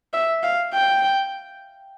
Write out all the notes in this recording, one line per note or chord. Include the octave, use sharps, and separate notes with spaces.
E5
F5
G5